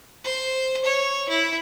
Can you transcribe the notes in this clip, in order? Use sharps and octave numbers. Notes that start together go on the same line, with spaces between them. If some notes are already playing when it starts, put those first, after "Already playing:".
C5
C#5
E4